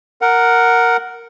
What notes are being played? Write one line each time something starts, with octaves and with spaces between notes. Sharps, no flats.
A#4 F#5